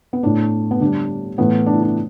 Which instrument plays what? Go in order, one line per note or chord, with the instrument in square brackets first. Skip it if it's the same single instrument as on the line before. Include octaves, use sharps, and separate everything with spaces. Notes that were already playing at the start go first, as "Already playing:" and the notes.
[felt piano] B3
A2 A3 D4
B3
D3 G3 D4
A2 E3 A3 B3
D4
E4
D4